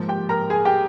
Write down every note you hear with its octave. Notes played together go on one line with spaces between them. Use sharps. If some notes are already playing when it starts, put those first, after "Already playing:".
Already playing: G#2 F3 A#3
G4 G5
A#4 A#5
G#4 G#5
G4 G5